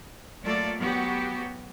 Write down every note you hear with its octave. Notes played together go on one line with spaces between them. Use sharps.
F#3 A3 A#3 F4 A4 D5
F#3 B3 F#4 G4